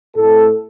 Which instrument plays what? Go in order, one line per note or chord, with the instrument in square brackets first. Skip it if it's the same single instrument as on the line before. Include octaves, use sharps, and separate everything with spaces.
[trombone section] A2 A3 C4 A4